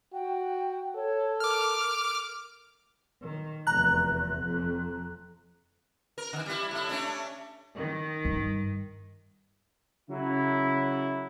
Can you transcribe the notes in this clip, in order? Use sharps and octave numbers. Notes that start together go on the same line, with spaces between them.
F#4 G5
A4 C#5
A#4 D6 F6
D#3
F1 E2 A#5 F#6
F2
A#4
D3 D#3
G3 E4
A2 E4
A3 C#4 D4
D#3
G2
C#3 F#3 E4